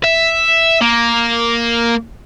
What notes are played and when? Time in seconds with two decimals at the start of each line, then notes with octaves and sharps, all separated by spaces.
0.04 E5
0.81 A#3